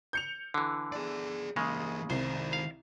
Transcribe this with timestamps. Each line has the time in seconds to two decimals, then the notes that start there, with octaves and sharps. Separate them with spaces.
0.13 G6 C#7 F7
0.54 D3 E3
0.92 G#4 D5
1.56 C#3 E3 G#3 A#3
2.10 C2 D#3 C5
2.53 F5